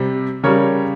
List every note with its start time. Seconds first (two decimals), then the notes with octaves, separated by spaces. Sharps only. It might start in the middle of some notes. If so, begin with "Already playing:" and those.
Already playing: C3 G3
0.43 C#3 G3 A#4 C#5